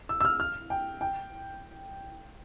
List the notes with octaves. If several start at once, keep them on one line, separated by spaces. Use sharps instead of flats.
E6
E6
F6
F6
G5
G5